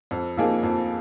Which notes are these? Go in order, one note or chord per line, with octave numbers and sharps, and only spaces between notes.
F2
F3 A#3 D#4 G#4
F2